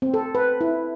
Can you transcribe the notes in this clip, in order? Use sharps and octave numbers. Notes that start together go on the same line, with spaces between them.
C4
A4
B4
E4